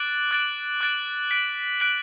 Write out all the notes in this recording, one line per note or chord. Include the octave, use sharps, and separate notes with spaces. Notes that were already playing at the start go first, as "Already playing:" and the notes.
Already playing: D6 F#6 A6 D7 F#7
D6 F#6 A6 D7 F#7
D6 F#6 A6 D7 F#7
F#6 B6 D7 F#7
F#6 B6 D7 F#7